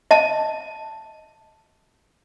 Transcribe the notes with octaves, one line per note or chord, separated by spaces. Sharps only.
D#5 A5